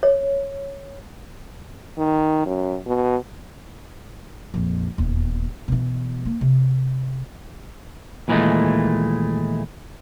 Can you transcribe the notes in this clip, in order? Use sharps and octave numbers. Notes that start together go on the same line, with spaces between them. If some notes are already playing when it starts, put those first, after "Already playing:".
C#5
D#3
F#2
B2
A#1 F2
D#1 E2
B2 E3
A#3
C3
D#2 A#2 E3 F#3 G#3 A3